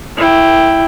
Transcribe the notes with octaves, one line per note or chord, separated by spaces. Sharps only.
E4 G5